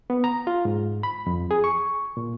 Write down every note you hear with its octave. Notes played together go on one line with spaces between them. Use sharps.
B3
A#5
F4
G#2
B5
F2
G#4
C#6
A#2